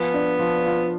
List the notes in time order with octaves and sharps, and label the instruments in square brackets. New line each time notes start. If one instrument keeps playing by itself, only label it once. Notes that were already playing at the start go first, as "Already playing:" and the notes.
Already playing: [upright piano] F3 [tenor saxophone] B3
[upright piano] D4
F3
F4